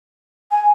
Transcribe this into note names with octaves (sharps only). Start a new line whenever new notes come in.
G#5